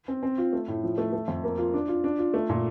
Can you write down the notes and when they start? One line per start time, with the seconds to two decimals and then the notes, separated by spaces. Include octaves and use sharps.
0.08 C4
0.23 C4
0.38 F4
0.53 A3
0.68 A2
0.84 F3
0.98 A3
1.13 A3
1.28 F2
1.44 A#3
1.58 F4
1.74 D4
1.88 F4
2.04 D4
2.19 F4
2.34 A3
2.50 A#2